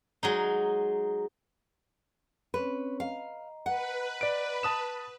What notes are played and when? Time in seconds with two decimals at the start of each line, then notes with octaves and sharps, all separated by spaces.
0.23 F#3 G#3 D#4
2.54 C4 C#4 B4 C#5
3.00 D#5 F5 A#5
3.66 B4 F#5
4.21 D5 D7
4.63 A5 D#6 E7